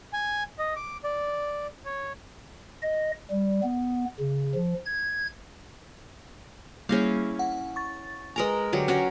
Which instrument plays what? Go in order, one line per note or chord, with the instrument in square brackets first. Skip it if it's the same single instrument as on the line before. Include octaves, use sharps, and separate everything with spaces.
[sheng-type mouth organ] G#5
D#5
D6
D5
C#5
[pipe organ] D#5
G3
B3
C#3
F3
G#6
[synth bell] G3 A#3 G#4 [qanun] C#4 E4 F5
[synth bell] F#5
C#6 A6
[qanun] G#3 A#4 A#5 [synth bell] B4 G#5
[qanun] D3 F#3 G4
C#4 F#4 A#4